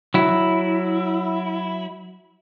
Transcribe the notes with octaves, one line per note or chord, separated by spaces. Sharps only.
F#3 E4